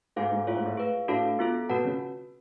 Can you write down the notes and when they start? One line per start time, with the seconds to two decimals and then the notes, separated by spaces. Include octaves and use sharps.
0.16 G#2 F#4 A4 F5 G#5
0.32 G#2
0.47 A2 F4 G#4 C#5 F5
0.56 G#2
0.66 A2
0.77 G#4 B4 F5
1.08 A2 D4 F#4 A4 F5 A5
1.39 B3 F4 A4
1.69 B2 F#4 B4 F#5 A5
1.84 C#3